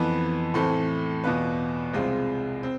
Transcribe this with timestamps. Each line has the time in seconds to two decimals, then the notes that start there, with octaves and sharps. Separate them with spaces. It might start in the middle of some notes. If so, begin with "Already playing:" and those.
Already playing: F2 E3 B3
0.54 A2 E3 A3 C4
1.24 E2 B2 B3 F4 B4
1.94 C2 C3 G#3 C4 F4
2.63 C4